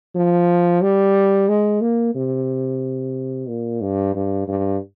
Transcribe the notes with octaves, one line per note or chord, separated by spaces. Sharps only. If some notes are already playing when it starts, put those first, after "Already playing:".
F3
G3
G#3
A#3
C3
A#2
G2
G2
G2